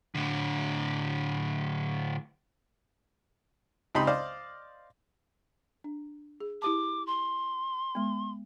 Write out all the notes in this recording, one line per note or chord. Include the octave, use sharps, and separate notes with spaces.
A2 D3
C#2 C4 D#4 G4 B5 C6
C5 D5 D#5 F5
D4
G#4
E4 G4 A5 D6
C6
G#3 B3